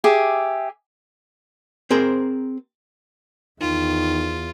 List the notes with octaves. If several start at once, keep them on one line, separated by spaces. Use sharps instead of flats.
G4 G#4 E5 D6
C4 G#4 A#4 C5
E2 D#3 F4